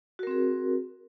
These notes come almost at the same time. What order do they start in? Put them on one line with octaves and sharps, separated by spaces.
F#4 A#4 C4 G#4